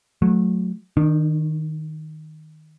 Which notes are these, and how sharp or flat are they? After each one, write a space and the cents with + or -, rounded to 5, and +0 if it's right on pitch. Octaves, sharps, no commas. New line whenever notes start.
F#3 -15 A3 -20
D#3 +0 D4 +45